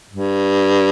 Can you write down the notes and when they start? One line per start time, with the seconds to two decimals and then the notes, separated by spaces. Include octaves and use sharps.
0.11 G2